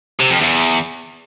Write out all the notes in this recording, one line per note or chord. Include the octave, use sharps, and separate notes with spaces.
C3
F2
E2